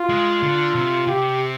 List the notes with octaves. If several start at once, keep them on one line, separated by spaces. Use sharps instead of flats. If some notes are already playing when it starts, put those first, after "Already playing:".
Already playing: F4
G#3
D3
C3
C3 G4